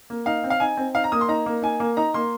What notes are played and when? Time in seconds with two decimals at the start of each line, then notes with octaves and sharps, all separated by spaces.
0.10 A#3
0.26 D#4 F5
0.44 C4
0.50 F5
0.60 D#4 G#5
0.77 C4
0.95 D#4 F5
1.04 A#5
1.12 A#3 D#6
1.21 C6
1.28 D#4 A#5
1.46 A#3
1.62 D#4 G#5
1.80 A#3
1.97 D#4 A#5
2.14 A#3 C6